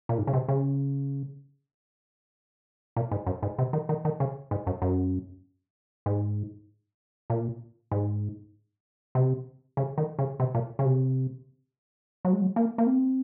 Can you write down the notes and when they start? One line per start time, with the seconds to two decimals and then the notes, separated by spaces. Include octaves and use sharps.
0.09 A#2
0.18 G#2
0.27 C#3
0.33 C3
0.48 C#3
2.96 A#2
3.11 G#2
3.26 F#2
3.42 G#2
3.58 C3
3.73 D#3
3.89 D#3
4.05 D#3
4.20 C#3
4.51 G#2
4.67 F#2
4.82 F#2
6.06 G#2
7.30 A#2
7.91 G#2
9.15 C3
9.77 C#3
9.98 D#3
10.19 C#3
10.40 C3
10.55 A#2
10.79 C#3
10.85 C3
12.25 F#3
12.33 G#3
12.42 F#3
12.56 A#3
12.78 A#3
12.87 C4